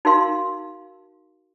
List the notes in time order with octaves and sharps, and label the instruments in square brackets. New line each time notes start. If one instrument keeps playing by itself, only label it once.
[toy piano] D#4 F#4 A#4 F5 C6